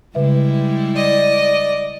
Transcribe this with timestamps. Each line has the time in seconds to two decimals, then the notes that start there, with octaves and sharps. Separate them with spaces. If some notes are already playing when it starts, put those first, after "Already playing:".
0.15 C#3 G3 G#3 E4 B4 E5
0.96 D5 D#5